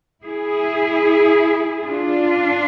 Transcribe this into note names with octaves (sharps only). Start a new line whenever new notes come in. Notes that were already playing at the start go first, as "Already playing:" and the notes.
E4 G#4
D4 F4